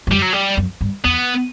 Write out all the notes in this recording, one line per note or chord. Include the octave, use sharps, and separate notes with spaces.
G2
F#2 G3
F#3
G3
F#2
G2
E2 B3